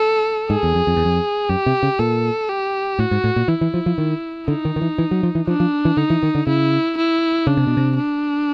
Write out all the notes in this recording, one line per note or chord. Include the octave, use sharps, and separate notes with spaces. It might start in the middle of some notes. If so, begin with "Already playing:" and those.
Already playing: A4
G#2 G#4
E2
F2
F2
E2
F2
F#2 G4
C3
C#3
A#2 A4
G4
A2 F#4
G#2
A2
A#2
E3 E4
E3
F3
F3
D#3
D3 D#4
D#3
D#3
E3
E3
F#3
F3
E3
F3 D4
F3
E3
D3 D#4
E3
D#3
D3
C#3 E4
E4
C#3 D4
C3
B2
C3
D4